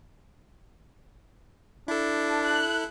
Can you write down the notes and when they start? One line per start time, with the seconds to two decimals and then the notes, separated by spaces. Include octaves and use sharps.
1.88 D4 E4 A4
2.44 F#6